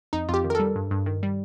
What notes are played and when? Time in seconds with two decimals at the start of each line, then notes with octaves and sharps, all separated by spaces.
0.13 F2 D#4
0.29 F2 F4 G4
0.44 D#3
0.50 A#4
0.55 G3 A4
0.76 G2
0.91 G2
1.06 D#3
1.23 G3